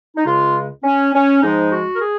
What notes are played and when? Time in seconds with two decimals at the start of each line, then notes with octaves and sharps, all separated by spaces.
0.17 D#4
0.25 C#2 C#3 G#3 F4
0.84 C#4
1.14 C#4
1.42 G#2 F3 G#3 D#4
1.71 F#4
1.95 A#4
2.01 G#4